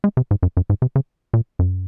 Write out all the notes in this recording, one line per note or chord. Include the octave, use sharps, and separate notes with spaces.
G#3
C3
G#2
F#2
F#2
G#2
C3
C#3
A#2
F#2